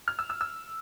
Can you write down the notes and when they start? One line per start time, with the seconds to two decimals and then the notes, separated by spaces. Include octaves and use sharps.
0.08 F6
0.19 E6
0.30 E6
0.41 E6